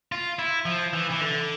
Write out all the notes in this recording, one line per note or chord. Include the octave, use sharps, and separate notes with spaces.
F4
E4
F3
E3
E3
D3